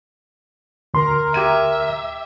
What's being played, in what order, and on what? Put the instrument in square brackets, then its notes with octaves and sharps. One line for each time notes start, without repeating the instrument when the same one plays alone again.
[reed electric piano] D2 C6 [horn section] A#4
[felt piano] G4 G#6 D#7 [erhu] E5